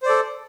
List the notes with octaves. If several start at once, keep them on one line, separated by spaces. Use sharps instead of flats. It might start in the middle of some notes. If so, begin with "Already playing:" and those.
A4 C5 D5